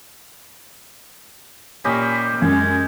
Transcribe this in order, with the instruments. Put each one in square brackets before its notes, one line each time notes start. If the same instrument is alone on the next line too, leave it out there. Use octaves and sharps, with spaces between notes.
[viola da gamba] A#2 [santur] C#4 G4 D#5 [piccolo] B5
[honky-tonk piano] F#2 [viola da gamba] G#3 [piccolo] G#6